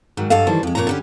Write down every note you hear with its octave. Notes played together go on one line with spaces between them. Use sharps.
G#2 D#3 F#3
G2 F#3 A4 D#5 F5
D#3 E3 G3 A4 C5
F2 G#3
F2 A#2 D#3 C#5 A5 A#5
D3 G3 C#4